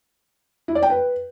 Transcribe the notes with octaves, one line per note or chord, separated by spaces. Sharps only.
E4
D5
G5
B4